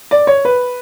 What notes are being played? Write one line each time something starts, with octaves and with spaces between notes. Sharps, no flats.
D5
C#5
B4